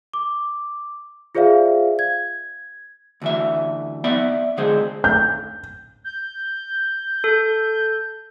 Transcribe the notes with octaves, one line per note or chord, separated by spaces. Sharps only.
D6
F4 G#4 C5 D5 E5 F5
G#6
D2 E3 E5
B3 D5 E5
D3 G#3 G#4 C5
G6
G6
A4